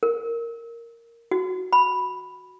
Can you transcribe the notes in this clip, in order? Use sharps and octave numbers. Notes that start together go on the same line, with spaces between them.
A#4
F#4
B5